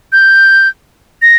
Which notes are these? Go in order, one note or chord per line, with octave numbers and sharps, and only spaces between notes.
G6
A#6